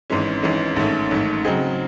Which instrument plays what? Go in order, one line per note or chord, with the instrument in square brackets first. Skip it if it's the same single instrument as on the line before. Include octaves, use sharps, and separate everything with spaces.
[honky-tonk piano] G#1 G#2 E3 G#3 C#4
G#1 G#2 E3 G#3 C#4
A1 G#2 D#3 A3 C#4
A1 G#2 D#3 A3 C#4
C#3 F#3 C4 D#4 G#4